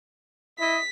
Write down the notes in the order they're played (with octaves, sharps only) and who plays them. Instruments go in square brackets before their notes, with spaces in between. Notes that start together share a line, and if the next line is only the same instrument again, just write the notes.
[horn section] E4 D#5 [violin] B6